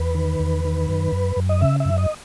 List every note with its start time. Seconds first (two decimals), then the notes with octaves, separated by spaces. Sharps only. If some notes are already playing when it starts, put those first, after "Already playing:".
Already playing: E2 B4
0.15 D#3
0.40 E2
0.65 D#3
0.89 F#2
1.12 F#2
1.36 F#2
1.49 D#5
1.61 C#3 E5
1.80 F#2 E5
1.98 D#5